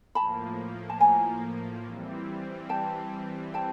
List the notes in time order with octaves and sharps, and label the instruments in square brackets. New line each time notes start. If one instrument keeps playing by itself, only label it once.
[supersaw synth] A2 F3 A#3 [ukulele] A5 B5
[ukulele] A5
G#5 A#5
[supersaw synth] E3 G3 C4
[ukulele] G5 A5
G5 A5